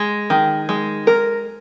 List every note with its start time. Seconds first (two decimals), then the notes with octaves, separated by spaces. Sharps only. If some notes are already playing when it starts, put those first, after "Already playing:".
Already playing: G#3
0.30 D#3
0.69 G#3
1.07 A#4